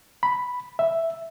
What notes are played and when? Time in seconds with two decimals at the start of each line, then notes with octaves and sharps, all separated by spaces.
0.23 B5
0.79 E5